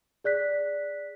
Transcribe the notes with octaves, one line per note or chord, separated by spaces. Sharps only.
G#4 D5 F#6 B6